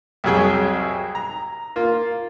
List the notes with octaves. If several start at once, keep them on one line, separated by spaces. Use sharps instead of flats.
C2 F2 F#3 G#4 G5
A#5
A#3 F4